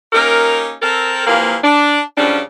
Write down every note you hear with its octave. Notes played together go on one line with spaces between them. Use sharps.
A#3 C#4 D#4 G4 A#4
C4 A4 A#4
C3 E3 F3 A#3
D4
F#2 C#3 F3 G3 C#4 D4